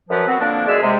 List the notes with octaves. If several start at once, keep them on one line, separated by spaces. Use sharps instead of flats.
F#2 F3 B4
B3 C4 F#4
D3 F3 A#3 D4
F#2 G#3 G#4 D5 E5 E6
C3 G#3